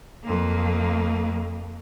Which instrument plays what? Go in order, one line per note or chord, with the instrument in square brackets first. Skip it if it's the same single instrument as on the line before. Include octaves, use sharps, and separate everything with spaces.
[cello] F2 A#3